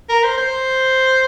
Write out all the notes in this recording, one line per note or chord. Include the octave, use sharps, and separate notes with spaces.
A#4
C5
C5